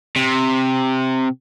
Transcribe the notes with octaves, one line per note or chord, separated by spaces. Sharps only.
C3